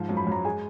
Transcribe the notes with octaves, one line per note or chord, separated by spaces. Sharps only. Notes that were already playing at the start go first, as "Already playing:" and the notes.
Already playing: G#2 F3
F#2
B5
F#2 A#5
G#3 G#5